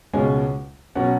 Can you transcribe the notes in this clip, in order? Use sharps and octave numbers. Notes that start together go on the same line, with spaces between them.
C#2 B2 G#3 C#4 G#5
B2 F#3 C#4 F#5